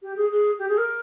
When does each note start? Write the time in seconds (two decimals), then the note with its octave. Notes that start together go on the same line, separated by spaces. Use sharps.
0.02 G4
0.16 G#4
0.31 G#4
0.59 G4
0.68 G#4
0.78 A#4